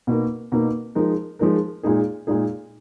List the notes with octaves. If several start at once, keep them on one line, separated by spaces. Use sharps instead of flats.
B2 A#3 D#4 A#4
B2 A#3 D#4 A#4
F3 G#3 D#4 A#4
F3 G#3 D#4 A#4
A#2 G#3 D#4 G#4
A#2 G#3 D#4 G#4